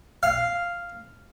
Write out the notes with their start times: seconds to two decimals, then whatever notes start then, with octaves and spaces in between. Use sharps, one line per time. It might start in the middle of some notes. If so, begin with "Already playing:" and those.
0.23 F5